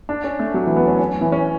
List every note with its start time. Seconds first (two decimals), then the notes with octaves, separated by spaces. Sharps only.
0.09 D4
0.24 C#4
0.39 A3
0.54 F#3
0.66 E3
0.76 B3
0.87 C#4
0.99 C#4
1.21 E3
1.32 C#4